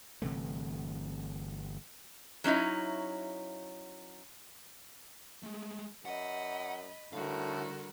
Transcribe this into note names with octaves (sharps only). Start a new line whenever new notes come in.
G1 C3 E3 A3
F#3 C#4 D#4 E4
G#3 A3
F#2 D#5 F#5 B5
A2 D3 G3 F#4 A#4 F5